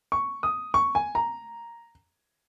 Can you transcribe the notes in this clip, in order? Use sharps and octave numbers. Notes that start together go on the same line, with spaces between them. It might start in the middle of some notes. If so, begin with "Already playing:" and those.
C#6
D#6
C#6
G#5
A#5